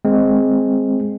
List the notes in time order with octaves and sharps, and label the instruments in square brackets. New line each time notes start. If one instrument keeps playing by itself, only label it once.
[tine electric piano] G#3 C4